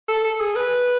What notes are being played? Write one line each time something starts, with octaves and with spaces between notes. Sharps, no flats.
A4
A4
G#4
B4